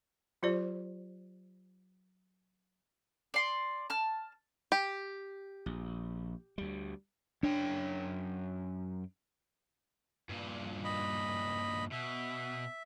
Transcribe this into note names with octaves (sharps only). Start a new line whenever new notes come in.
F#3 F4 G4 C5 D5
D5 C6
A5 F6
G4
A#1
D2 G3
F#2 D4 C#5 G5
G2 A#2
D#5 B5
B2 E5